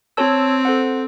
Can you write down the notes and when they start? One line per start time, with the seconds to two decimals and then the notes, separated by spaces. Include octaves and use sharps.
0.17 C4 C#5 A5 E6
0.65 A4 C5 F#5